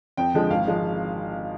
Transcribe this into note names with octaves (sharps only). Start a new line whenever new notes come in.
F2 G5
D3 F3 G#3
G#1 F5
F3 G#3